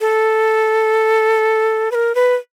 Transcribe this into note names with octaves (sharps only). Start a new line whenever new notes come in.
A4
B4
A#4
B4